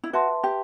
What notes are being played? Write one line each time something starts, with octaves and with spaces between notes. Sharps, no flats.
E4
F#4 B4 E5 A5 C6
G4